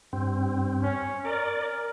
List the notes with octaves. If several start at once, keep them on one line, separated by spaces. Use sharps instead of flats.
G2 C4
C#4
A#4 D5
A#4